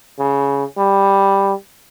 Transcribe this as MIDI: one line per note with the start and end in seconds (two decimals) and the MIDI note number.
0.19 0.64 49
0.78 1.53 55